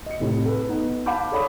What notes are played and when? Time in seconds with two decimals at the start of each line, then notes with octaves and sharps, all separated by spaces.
0.06 D#5 C#7
0.20 A2 C3
0.45 A4 B4
0.69 B3 D#4
1.06 F5 F#5 A5 B5 D6 G6
1.32 G#4 A4 C#5 D5 B5 D#6